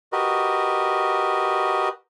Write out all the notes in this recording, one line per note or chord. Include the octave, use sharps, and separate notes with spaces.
F#4 G4 A#4 B4 D#5